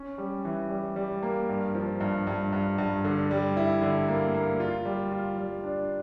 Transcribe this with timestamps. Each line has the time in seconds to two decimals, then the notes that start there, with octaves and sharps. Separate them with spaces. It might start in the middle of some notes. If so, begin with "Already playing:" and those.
Already playing: C#4
0.18 G3
0.45 E3
0.70 G3
0.96 G3
1.23 A#3
1.49 G2
1.75 F3
2.01 G2
2.27 G2
2.52 G2
2.78 G2
3.05 D3
3.31 G3
3.57 E4
3.82 D3
4.08 A#3
4.34 A#3
4.60 F4
4.85 G3
5.12 F4
5.38 G3
5.64 D4